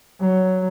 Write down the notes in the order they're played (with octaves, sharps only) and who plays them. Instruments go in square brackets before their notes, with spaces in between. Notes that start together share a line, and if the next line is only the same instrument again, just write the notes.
[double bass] F#3